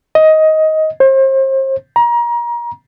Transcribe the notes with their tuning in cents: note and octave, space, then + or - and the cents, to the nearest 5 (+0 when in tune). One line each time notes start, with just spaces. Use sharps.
D#5 +15
C5 +35
A#5 +30